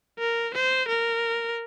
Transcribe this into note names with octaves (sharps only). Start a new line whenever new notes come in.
A#4
C5
A#4